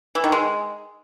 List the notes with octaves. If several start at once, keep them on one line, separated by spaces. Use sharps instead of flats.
E3
D#3
G#3